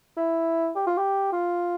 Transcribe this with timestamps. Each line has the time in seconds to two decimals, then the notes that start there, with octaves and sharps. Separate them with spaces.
0.17 E4
0.76 G4
0.87 F4
0.97 G4
1.32 F4